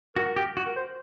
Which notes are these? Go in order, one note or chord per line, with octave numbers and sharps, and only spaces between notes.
F#4 A#4
G4
F#4
A#4
C5